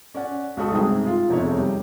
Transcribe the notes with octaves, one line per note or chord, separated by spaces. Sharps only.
C#4 D5 F#5
C#2 F#4 A4 D#6
G1 G#2 C3 G#4 G5 D#6
F4
F1 E2 C3 A3 D#4 C#5
G3